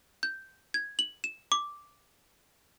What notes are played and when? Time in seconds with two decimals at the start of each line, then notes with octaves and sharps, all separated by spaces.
0.23 G6
0.74 G#6
0.99 F#7
1.24 E7
1.52 D6